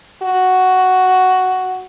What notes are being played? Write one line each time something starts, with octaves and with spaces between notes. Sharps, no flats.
F#4